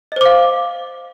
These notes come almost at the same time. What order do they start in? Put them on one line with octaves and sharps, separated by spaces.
D#5 C5 D6 F5